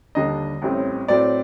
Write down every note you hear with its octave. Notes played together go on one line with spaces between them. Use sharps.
D#2 D3 G3 D4 D#5
A1 A2 G3 C4
A2 F#3 C4 D5